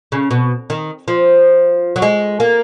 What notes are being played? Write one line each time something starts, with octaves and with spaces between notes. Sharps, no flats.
C#3
B2
D#3
F3
F#3
G#3
A#3